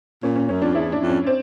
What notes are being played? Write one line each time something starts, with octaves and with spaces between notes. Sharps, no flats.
A#2 C#4
C#4
F#2 C#4
F2 D4
E2 E4
D4
F2
C#4
C4